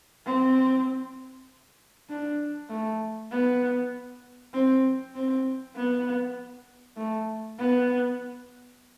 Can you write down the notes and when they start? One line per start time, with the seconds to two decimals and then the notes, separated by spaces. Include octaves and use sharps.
0.26 C4
2.09 D4
2.70 A3
3.31 B3
4.54 C4
5.15 C4
5.76 B3
6.97 A3
7.58 B3